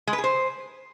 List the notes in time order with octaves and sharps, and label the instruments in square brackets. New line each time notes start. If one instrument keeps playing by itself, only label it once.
[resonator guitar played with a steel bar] G#3
B4
G#4
C5